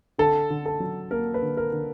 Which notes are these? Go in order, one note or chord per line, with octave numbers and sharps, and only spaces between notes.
D3 A4
D3
A4
F#3
A#3 A#4
B4
D3
A#4
D3